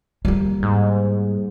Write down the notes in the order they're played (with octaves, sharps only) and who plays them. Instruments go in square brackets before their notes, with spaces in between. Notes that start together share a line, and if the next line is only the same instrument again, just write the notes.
[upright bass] G3 A#3
[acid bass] G#2